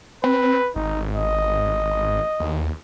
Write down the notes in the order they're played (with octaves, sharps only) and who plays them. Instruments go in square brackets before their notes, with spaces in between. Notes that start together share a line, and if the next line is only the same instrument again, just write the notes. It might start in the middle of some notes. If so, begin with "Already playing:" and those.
[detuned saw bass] C4 [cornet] B4
[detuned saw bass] G#1 [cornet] D#4
[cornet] D#5
[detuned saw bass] D#2